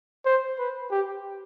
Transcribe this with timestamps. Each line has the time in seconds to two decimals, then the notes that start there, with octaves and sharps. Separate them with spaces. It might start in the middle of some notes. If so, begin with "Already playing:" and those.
0.26 C5
0.59 B4
0.91 G4